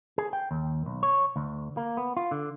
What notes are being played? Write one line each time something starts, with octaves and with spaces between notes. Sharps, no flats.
G#4
G5
D#2
B1
C#5
D2
A#3
B3
F4
D3